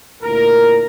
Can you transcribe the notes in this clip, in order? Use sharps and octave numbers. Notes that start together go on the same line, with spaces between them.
D2 A#2 E4 A#4